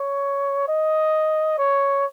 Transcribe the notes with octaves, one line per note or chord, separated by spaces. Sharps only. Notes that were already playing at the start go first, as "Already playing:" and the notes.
Already playing: C#5
D#5
C#5